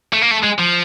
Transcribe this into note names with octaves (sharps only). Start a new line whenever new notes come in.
A3
A#3
A3
G#3
F3